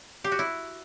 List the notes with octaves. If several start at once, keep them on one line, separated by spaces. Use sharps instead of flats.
G4
F#4
E4